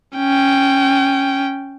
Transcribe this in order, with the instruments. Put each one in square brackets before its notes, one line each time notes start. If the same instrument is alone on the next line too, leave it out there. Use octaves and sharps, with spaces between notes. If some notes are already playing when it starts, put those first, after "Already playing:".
[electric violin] C#4 G5